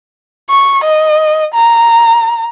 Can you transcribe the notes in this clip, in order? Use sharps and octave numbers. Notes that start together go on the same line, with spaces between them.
C#6
D#5
A#5